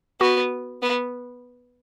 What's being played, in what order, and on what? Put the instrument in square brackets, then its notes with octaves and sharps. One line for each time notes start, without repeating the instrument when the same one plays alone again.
[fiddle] B3 [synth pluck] F#4
[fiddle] B3